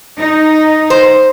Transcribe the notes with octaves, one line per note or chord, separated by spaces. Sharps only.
D#4
C5